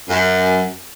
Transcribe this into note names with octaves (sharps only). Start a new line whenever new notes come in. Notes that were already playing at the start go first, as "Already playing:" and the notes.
F#2